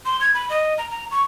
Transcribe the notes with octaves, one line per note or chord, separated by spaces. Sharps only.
C6
G#6
B5
D#5
A#5
A#5
C#6